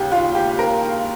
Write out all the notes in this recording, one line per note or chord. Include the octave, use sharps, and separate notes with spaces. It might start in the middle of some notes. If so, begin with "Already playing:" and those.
Already playing: D#2 C#3 G4
F4
G4
A#4